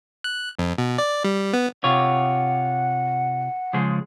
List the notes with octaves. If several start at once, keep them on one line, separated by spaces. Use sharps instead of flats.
F#6
F2
B2
D5
G3
B3
C3 F4 C#5 F#5
C#3 F3 G#3